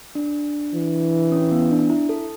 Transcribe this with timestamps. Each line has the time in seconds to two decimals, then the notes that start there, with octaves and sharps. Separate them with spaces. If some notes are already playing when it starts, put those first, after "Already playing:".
0.15 D4
0.74 E3
1.32 C#4
1.51 B3
1.70 D4
1.90 E4
2.09 A4